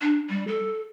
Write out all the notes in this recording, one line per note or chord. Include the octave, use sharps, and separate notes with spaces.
D4
G3
A4